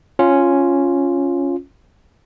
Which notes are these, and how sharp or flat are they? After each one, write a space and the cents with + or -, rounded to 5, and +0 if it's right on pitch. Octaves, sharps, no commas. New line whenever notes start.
C#4 +0 F4 +0